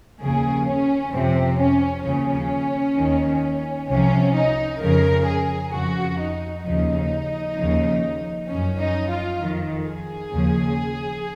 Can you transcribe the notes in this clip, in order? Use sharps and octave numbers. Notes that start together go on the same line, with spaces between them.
D#2 C#3 F3 G#4
C#4
F2 C3 F3 C4
C#4
D#2 C#3 F3 C#4
D#2 D#3
C2 C3 F3 C#4
D#4
F2 C#3 F3 A#4
G#4
F2 C#3 F3 F#4
D#4
D#2 C#3 F3 D#4
D#2 C#3 F3
F#2 F3 C#4
D#4
F4
F2 D#3
G#4
D#2 C#3 F3